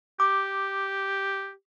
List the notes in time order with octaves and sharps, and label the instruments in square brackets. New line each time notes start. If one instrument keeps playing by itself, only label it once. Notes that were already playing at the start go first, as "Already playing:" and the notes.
[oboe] G4 [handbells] D6